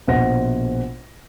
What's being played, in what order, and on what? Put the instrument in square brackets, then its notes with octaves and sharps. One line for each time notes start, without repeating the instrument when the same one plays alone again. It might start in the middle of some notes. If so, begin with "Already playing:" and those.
[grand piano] A#1 B2 C5 F#5 A#6